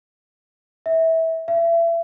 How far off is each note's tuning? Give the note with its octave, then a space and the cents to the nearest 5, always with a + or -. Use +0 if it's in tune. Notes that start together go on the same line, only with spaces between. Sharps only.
E5 -20
E5 +30